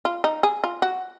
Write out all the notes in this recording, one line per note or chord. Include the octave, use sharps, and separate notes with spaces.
F4
D#4
G#4
F4
F#4